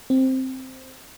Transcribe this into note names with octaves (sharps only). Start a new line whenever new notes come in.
C4